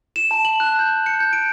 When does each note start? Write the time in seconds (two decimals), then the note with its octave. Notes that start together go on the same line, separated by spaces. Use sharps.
0.16 E7
0.31 A5
0.45 F#7
0.60 F#6
0.79 G6
1.06 C#7
1.20 G6
1.33 D7